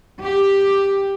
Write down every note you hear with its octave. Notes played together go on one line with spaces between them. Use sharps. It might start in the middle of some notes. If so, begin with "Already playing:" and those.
G4